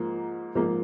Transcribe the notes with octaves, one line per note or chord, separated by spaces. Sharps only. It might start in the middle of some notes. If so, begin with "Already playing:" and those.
Already playing: G#2 F3 A#3
G#2 F3 A#3